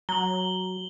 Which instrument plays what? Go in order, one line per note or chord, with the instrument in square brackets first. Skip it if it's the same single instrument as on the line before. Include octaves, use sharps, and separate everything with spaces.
[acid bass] F#3 [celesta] A#5 [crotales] F#7 G7